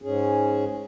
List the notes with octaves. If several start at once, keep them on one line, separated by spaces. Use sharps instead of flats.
G#2 C#4 G#4